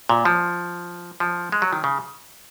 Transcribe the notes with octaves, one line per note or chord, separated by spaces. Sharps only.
A#2
F3
F3
G#3
F#3
D#3
C#3